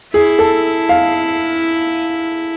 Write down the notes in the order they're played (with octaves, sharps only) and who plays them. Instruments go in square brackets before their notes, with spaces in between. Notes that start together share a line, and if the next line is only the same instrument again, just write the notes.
[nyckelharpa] E4 [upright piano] G#4
[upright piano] A4
F5